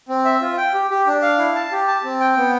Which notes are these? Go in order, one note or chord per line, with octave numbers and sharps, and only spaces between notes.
C4
E5
F4
G5
G4
G4
D4
F5
E4
A5
G4
A5
C4
G5
B3